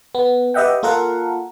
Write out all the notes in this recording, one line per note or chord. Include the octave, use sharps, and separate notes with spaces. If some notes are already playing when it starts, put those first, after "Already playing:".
B3
G4 B4 D#5 E5 F#5 G5
A#3 F4 A4 A#4 F5 F#5